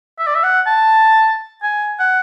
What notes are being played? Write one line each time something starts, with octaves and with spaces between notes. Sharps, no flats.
E5
D5
E5
F#5
A5
G#5
F#5